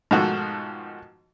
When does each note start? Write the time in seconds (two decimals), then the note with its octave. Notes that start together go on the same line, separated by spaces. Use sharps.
0.11 G#2 B2 D#3 F3 A3 F#4